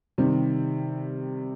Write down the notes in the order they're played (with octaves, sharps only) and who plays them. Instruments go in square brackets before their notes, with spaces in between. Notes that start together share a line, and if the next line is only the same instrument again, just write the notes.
[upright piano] C3 D#3 G3 C4